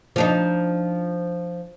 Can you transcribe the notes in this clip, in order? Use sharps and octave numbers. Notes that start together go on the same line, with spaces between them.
F3 D4 D#4